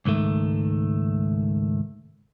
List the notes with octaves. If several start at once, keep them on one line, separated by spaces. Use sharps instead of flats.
C#2 G#2 D#3 A3